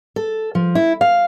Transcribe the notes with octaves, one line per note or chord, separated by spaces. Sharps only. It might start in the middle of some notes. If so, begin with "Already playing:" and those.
A4
F3
E4
F5